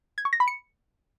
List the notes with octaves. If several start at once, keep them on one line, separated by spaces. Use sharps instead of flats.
G#6
C#6
A#6
B5
C#7